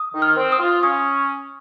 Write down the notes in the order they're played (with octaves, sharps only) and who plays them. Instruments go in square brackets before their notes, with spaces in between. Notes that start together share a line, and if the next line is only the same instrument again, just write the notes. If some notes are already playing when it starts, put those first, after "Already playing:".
Already playing: [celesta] D#6
[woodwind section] D#3
[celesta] F6
[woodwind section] C4
[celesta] D#6
[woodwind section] F4
[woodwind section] C#4 [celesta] D#6